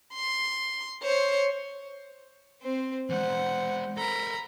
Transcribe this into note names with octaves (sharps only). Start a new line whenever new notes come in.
C6
C5 C#5
C4 C5
E3 G#3 C5 F#5
A4 A#4 A#5 B5